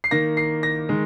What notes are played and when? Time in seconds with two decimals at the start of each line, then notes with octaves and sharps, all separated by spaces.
0.04 C7
0.11 D#3 A#3 A#6
0.37 C7
0.63 A#6
0.89 D#3 G#3